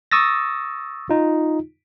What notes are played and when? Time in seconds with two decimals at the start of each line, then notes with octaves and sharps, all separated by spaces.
0.12 C#6 D#6 E6 A6 A#6
1.10 D#4 F4